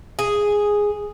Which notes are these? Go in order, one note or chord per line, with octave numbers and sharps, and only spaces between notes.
G#4